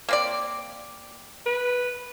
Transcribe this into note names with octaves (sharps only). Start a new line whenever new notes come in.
A#3 C4 D5
B4